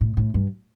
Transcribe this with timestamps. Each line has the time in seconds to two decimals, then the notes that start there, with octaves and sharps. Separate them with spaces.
0.01 A2
0.17 A2
0.34 G2